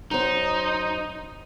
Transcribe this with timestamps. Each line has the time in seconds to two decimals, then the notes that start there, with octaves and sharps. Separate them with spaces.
0.11 F#2 D#4 C5